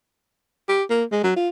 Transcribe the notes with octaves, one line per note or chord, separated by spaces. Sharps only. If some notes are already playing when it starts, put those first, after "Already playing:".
G4
A#3
G#3
F#3
F4